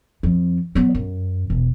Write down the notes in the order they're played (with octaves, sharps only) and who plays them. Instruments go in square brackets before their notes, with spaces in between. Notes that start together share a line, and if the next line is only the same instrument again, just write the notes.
[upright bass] F2
F#3 B3
F#2
E1